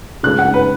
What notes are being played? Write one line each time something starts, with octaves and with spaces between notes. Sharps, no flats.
C#3 G#3 F#6
F#5
B4